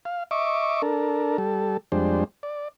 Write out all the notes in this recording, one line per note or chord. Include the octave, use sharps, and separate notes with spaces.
F5
D#5 E5 C#6 D6
D4 A4 A#4
G3 A4
F2 G3 G#3 D4 C5
D5